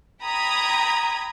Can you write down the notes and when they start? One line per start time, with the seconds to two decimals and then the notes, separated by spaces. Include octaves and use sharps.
0.22 G5 A#5 B5 D#6 G#6